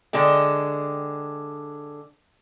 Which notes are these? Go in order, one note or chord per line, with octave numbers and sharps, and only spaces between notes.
D3 G#3 D4 G5